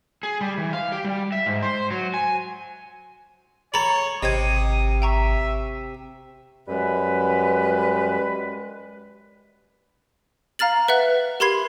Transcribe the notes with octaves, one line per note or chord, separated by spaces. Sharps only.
G#4
G3
E3
F5
G4
G3
E5
G#2
C5
F#3
G#5
A4 C#5 A#5 B5
G#1 C3 D#5 D#6 G#6
E5 G5 A#5 C#6
F#2 G3 G#3 B4
F5 A#5 F6 A6 F#7
B4 E5 F#5 F#6
G4 A#4 B5 C6 G#6 C7